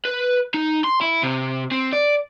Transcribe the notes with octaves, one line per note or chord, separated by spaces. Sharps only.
B4
D#4
C6
E4
C3
C4
D5